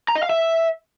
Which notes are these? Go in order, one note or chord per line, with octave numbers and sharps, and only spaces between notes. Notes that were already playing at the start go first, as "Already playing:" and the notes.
A#5
D#5
F5
E5